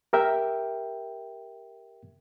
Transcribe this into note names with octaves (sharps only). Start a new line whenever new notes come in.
G4 A#4 E5 G5